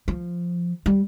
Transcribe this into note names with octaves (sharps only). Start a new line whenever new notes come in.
F3
G3